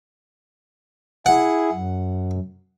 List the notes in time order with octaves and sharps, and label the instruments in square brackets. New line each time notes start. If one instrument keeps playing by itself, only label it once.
[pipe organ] E4 G#4 [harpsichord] F#5
[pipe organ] F#2